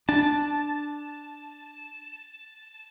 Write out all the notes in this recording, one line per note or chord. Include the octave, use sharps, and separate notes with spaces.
D4 A5